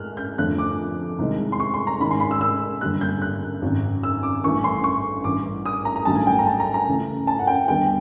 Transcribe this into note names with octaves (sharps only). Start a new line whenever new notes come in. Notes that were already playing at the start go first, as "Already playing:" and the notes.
Already playing: A2 G#3 F6 F#6
G6
F2 D3 F3 A3 F#6
D6
C2 C3 D#3 G#3
C6
C#6
C6
A#5
G#2 D#3 G#3 C#4 B5
C6
B5
E6
E6
G1 F#2 D3 G3 A#3 F#6
G6
F#6
G#1 F#2 C#3
E6
D6
A1 G2 E3 A3 C#4 C#6
C6
C#6
A1 G2 E3 D6
D#6
A#5
A#5
A1 G2 D#3 F#3 A3 A5
G#5
G5
A#5
A5
A#5
A#5
C#2 C#3 E3 A3
A5
F#5
G5
D#2 D3 G3 B3 D#4 G5